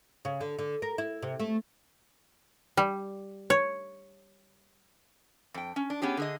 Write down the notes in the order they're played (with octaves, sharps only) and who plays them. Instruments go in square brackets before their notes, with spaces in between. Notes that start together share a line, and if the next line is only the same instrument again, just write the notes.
[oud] C#3
D3
D3
A#4
E4
C3
A3
[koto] G3
C#5
[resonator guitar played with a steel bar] F2 G5
C#4
D4
B3 C#4 G4 G#4
D3 G#4 D#5